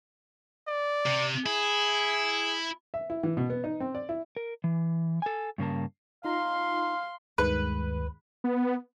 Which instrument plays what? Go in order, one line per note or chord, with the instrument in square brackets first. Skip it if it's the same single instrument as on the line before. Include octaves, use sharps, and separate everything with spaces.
[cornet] D5
[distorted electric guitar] C3
[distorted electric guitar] E4 [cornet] G#4
[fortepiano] E5
E4
E3
B2
B3
D#4
C4
D5
E4
[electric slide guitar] A#4
E3
A4 G#5
G2 C#3 A#3 A5
[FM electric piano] D#4 F4 A#5 [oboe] F5 [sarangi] C6
[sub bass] D2 [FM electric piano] G2 D#3 G#3 [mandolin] B4
[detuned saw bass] B3